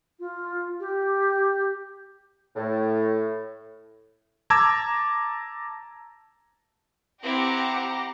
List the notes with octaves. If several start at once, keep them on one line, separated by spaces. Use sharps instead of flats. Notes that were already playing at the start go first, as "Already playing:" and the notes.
F4
G4
A2
A5 A#5 D6 E6 G#6
C4 E4 G4 F#5 A#5